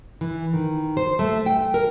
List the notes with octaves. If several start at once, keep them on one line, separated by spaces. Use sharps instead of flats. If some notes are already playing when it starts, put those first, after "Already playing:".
E3
D#3
C5
A3
G5
A#4